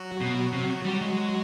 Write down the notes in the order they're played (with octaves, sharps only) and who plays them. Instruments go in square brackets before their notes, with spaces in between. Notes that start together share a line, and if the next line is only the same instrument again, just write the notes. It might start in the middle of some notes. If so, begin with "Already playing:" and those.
Already playing: [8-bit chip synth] F#3 F#4
[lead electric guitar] B2
C3
G3
G#3